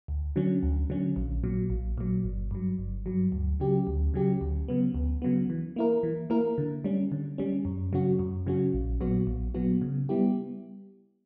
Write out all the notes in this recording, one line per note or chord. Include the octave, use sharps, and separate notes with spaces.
D2
D3 F#3 C#4
D2
D3 F#3 C#4
A#1
A#2 F#3
A#1
A#2 F#3
G1
G2 F#3
G1
G2 F#3
D2
C#3 F#3 C#4 G4
D2
C#3 F#3 C#4 G4
D2
C#3 F#3 B3
D2
C#3 F#3 B3
E3
A#3 E4 A#4
E3
A#3 E4 A#4
D3
G3 C#4
D3
G3 C#4
F#2
C#3 F#3 C#4 F#4
F#2
C#3 F#3 C#4 F#4
A#1
A#2 F#3 B3 F#4
A#1
A#2 F#3 B3 F#4
C#3
G3 B3 E4 G4